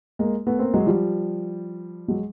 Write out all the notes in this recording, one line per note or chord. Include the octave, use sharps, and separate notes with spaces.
G#3 A#3
A3 B3
A#3 C4
F#3 G#3
F3 G3
F#3 G#3